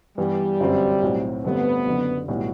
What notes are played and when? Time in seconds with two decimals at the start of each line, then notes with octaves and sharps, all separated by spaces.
0.17 G2 E3 G3 B3
0.60 G1 F#2 F#3 C4
1.02 B1 A2 F#3 C4
1.44 G1 G2 D3 A3 B3 C4
1.86 F#1 F#2 D3
2.28 B1 A2 G3 B3 F#4